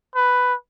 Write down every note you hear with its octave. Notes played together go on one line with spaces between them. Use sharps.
B4